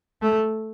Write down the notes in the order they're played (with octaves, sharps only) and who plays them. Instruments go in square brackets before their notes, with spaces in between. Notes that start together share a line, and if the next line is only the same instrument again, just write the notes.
[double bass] A3